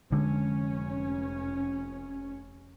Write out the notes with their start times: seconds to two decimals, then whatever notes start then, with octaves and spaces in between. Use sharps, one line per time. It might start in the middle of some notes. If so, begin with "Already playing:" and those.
0.12 F1 D3 G#3 C#4